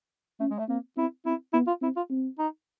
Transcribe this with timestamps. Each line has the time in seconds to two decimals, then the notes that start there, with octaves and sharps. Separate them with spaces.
0.40 A3 C#4
0.51 G#3
0.59 A3
0.68 A#3 C4
0.97 C4 E4
1.26 C4 E4
1.53 B3 E4
1.67 F4
1.82 C4 E4
1.96 F4
2.10 C4
2.39 D#4